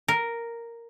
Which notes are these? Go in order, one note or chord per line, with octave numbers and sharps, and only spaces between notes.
A#4